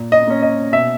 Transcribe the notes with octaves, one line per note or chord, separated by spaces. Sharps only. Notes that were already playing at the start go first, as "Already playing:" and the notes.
Already playing: A#2
D#5
A#3 C#4
D#5
B2 E5